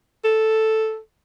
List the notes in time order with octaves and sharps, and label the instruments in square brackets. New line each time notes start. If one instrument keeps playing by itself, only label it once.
[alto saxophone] A4